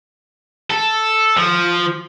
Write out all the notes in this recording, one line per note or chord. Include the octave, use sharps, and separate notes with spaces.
A4
F3